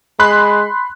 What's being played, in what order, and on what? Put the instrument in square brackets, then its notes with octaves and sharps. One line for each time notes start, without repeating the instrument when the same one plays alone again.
[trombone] G#3 [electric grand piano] B5 C6 F#6